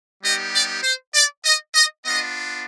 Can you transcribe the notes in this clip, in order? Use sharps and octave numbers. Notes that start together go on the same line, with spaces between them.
G3 B3 D#4 G4 D#5
D5
C5
D5
D#5
D#5
B3 D4 F4 D#5